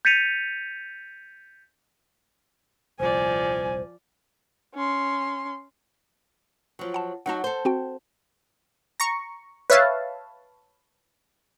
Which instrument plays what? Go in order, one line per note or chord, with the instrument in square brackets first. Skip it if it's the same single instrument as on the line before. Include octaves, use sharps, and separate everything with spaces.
[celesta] G6 A6 B6 C#7 D#7 F7
[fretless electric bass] D#1 C2 [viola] F3 D5 [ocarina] C5 [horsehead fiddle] G#5
[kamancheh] C#4 C6
[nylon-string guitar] F3 F#3
[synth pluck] F#5 A5
[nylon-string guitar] F#3 D#4 F#4 [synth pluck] F#5 A5
[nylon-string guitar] A4 C5
[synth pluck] C4 F#4 G5
A#5 C#6
B4 C#5 E5 F5 A5